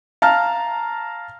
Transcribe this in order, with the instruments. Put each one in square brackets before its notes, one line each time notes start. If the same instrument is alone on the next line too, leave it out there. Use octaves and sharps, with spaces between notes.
[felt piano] F5 A5 A#5 F6